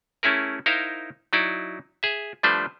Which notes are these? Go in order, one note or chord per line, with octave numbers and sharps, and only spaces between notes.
A3 C#4 E4 G#4 A#4
D#4 E4 A#4 C5 F5
F#3 D#4 E4 D5
G#4 E5
F3 G3 A3 D4 B4 C5